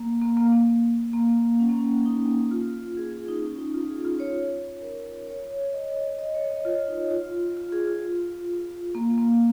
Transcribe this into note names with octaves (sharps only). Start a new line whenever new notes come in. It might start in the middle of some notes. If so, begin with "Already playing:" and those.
Already playing: A#3
A#3
A#3
A#3
A#3
C#4
A#3
C#4
D#4
F4
G#4
G#4
D#4
C#4
D#4
F4
G#4
F4
C#5
A#4
C#5
C#5
D#5
D#5
D#5
C#5
D#5
F4
D#4
F4
F4
G#4
F4
A#3
A#3